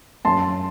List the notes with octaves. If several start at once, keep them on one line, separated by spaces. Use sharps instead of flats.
F#2 A5 C6